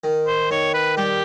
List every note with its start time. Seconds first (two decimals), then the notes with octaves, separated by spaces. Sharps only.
0.04 D#3
0.26 C5
0.51 D#3 C#5
0.74 B4
0.97 G3 G4